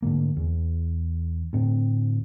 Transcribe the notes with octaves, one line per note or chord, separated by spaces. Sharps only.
D2 G#2 D3 A#3
E2
D2 A2 C4